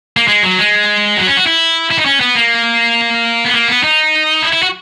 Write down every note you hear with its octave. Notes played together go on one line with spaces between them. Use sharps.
A#3
G#3
F#3
G#3
F#3
C#4
F#4
E4
E4
D#4
C#4
B3
A#3
B3
A#3
B3
D#4
E4
E4
F#4